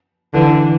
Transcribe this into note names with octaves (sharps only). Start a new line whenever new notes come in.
D3 E3